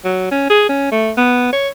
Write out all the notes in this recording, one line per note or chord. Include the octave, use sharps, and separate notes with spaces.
F#3
C#4
G#4
C#4
A3
B3
C#5